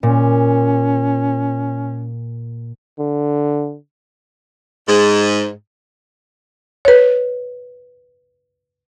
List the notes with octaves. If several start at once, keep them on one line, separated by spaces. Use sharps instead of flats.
A#2 C#4
D3
G#2
B4 C#5